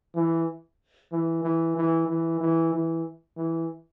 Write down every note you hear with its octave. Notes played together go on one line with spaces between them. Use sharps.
E3
E3
E3
E3
E3
E3
E3
E3